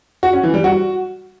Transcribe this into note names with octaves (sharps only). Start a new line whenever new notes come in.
F#4
C#4
E3
G3
F#4